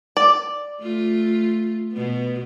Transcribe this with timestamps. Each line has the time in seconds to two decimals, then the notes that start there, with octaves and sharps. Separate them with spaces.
0.17 D5
0.80 A3 F4
1.92 B2 B3